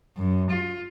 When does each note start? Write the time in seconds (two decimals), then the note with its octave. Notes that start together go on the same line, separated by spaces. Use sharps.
0.17 F#2
0.50 F4